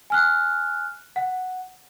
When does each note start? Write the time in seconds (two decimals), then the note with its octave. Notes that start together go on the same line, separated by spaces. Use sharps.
0.10 G#5 F6 F#6
1.16 F#5